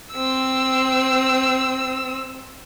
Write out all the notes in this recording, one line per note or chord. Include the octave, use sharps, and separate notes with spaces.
C4 E6